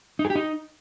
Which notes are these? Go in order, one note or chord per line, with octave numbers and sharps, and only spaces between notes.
D#4
G#4
G4
D#4